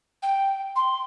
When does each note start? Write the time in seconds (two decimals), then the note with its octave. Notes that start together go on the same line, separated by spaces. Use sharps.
0.22 G5
0.75 C6